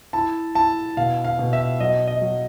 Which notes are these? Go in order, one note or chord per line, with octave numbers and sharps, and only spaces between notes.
E4 A5
E4 A5
B2 F5
F5
B2
E5
F#3 D#5
D#5
F#3